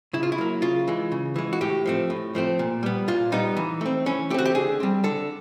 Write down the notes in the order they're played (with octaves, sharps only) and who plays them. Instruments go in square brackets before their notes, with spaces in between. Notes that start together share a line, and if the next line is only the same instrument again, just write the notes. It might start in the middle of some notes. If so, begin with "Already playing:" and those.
[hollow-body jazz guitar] C#3 E4
F4
E4
F#3 A#3
C#3 F4
E3 G#3
C#3
E3 G#3
F#4
A2 G4
F3 A3 C4
A2
F3 A3 C4
A#2
G3 B3
A#2 F4
G3 B3 D#4
E3
A3 C4
E3 C#4
A3 G4
C4 F#4
G4
D3 G#4
G3 C4
D3 A4